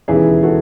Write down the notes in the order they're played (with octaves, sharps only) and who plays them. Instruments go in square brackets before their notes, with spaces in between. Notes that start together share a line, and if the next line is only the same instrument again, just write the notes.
[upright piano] E1 D#2 C#3 E3 E4 G#4
F#4 A4